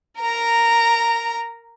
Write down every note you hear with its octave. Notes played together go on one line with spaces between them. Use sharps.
A#4 A#5